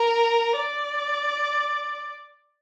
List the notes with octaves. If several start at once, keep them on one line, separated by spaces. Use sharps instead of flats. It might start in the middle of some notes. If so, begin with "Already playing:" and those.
Already playing: A#4
D5